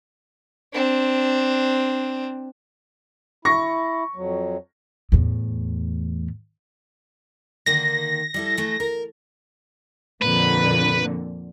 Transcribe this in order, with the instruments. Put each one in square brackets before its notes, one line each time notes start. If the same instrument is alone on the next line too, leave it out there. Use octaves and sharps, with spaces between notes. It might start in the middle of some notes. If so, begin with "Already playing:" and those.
[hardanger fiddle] C4 D4
[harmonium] E4 [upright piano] C#6 A#6
[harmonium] F2 F#3
[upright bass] E2 A2
[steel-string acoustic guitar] D3 D#3 A#3 [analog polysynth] A#6
[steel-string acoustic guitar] G3 E4 A4
E3 A3
A#4
[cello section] F2 A#2 D3 [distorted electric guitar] B4